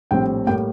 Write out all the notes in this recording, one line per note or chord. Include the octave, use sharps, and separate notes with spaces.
A#1 A2 G3 C4 G5
A2 G3 A#3 G5